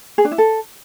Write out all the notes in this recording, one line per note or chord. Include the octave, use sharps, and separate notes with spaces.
G#4
D4
E4
A4